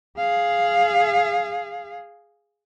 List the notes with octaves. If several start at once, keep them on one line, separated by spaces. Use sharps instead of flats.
G#4 F5